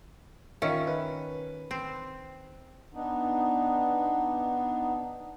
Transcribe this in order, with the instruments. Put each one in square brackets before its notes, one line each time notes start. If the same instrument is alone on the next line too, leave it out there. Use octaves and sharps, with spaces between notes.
[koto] D#3 C#4 [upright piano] F4 A#4 E5
[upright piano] B4
[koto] C4
[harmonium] B3 D4 D#4